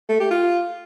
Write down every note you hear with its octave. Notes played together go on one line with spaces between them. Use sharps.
A3
G4
F4